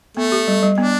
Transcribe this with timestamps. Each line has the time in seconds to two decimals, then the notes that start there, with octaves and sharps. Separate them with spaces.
0.17 A3 B3
0.32 G4
0.48 G3
0.63 G3
0.78 B3 D4